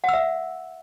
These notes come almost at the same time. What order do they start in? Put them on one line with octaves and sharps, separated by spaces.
F#5 E6 E5